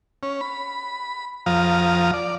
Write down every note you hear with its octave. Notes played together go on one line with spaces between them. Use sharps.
C#4
B5
F2 F3 F5 A#5 D#6
D5